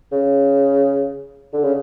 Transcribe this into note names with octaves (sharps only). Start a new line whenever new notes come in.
C#3
D3
C#3